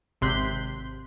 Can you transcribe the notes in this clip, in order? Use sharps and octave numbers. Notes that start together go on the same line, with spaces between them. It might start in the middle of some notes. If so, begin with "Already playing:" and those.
G#1 C3 C6 F#6 G6 B6